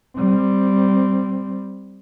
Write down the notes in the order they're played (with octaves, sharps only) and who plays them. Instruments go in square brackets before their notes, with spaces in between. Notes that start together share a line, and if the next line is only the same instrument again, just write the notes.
[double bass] G3 C4